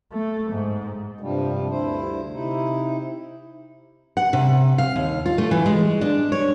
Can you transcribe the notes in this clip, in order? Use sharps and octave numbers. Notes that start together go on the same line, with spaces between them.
A3
G#2
G2 C3 F3 G3
D2 G2 E4 C5
C3 D#4 E4
F#5
C3
F5
D#2
F4
A3
E3
G#3
D4
C#5